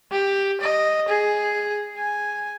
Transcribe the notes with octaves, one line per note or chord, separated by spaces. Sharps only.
G4
D#5
G#4
G#5